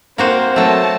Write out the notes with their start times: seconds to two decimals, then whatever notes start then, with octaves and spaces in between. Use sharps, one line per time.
0.18 A#3 C4 F#4 C5
0.56 F#3 A3 A5